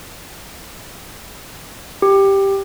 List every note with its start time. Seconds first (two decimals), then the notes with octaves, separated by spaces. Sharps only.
2.02 G4